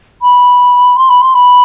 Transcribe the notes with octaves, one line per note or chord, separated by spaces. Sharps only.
B5
C6
B5
C6
B5